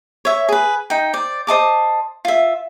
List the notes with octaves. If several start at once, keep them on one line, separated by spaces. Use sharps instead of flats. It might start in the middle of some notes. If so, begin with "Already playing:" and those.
C#5 E5
G#4 B4
D#4 G5
C5 D5
C5 D#5 A5 D6
F4 E5